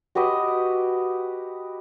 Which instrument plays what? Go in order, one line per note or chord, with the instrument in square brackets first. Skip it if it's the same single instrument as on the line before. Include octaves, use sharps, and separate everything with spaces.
[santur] F#4 G4 B4 D#5